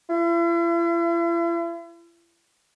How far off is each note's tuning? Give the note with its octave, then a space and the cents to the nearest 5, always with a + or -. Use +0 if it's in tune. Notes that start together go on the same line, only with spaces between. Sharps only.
E4 +45